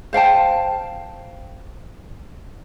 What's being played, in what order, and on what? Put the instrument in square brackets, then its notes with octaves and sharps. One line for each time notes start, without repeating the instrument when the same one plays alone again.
[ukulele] C5 F5 G5 A5